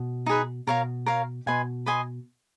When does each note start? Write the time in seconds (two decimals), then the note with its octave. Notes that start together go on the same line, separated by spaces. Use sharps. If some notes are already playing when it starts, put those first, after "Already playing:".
Already playing: B2
0.26 D#4 G#4 B4
0.67 B2 A#4 C#5 F5 A#5
1.06 A#4 C#5 F5 A#5
1.46 B2 B4 D#5 G#5 C6
1.86 B4 D#5 G#5 C6